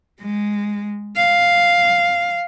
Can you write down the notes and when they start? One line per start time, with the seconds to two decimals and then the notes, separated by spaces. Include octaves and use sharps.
0.21 G#3
1.17 F5